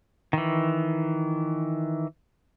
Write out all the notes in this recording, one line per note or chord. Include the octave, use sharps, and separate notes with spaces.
D#3 E3